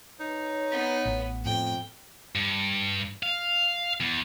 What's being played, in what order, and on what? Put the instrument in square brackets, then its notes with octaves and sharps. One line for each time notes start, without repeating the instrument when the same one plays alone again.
[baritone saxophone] D#4 [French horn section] B4 C#5
[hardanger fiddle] B3
[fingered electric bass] A1
[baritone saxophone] F2 [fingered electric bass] A2 [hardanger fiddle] G5
[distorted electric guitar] G2
F5
E2